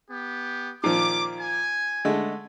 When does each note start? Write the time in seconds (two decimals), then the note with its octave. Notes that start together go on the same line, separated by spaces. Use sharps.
0.11 B3 G4
0.84 A#2 D#3 F3 D6
1.40 G#5
2.05 D3 G#3 A3